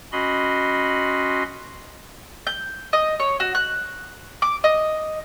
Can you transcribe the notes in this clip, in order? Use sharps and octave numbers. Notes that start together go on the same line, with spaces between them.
C#4 F#4 D#5 B5 C6
G6
D#5
C#5
F#4
F#6
D6
D#5